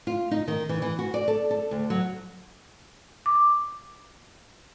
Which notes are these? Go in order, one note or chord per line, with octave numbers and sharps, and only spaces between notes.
F4
D#4
D#3
E3
E3
F#4
D5
A4
A4
D2
F#3
D6